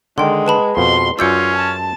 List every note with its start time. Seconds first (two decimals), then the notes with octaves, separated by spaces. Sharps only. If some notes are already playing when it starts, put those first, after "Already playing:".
0.18 D3 D#3 G#3 G5 C6
0.47 B4 A5 B5
0.77 F2 B2 C6
1.19 F#2 C#4 F4 D5 E6 G6 C#7
1.56 A5